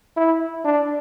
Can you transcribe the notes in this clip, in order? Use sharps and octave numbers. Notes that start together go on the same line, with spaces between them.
E4
D4